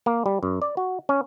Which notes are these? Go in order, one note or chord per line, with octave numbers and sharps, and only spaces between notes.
A#3
G3
F#2
D5
F#4
C#4